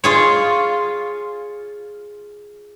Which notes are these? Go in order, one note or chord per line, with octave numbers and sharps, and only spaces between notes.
F4 G#4 C#5